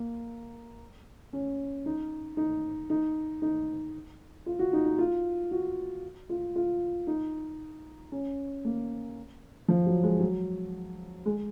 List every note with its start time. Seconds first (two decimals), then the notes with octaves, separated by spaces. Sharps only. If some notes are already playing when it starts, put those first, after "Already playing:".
Already playing: A#3
1.33 C#4
1.86 D#4
2.37 D#4
2.90 D#4
3.42 D#4
4.46 F4
4.59 F#4
4.73 D#4
4.85 D#4
4.98 F4
5.51 F#4
6.29 F4
6.56 F4
7.07 D#4
8.12 C#4
8.65 A#3
9.68 F3
9.87 F#3
10.03 G#3
10.20 F#3
11.25 G#3